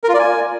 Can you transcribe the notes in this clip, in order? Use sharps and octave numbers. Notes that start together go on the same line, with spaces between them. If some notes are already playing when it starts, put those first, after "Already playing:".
A#4
F4
D5
G#5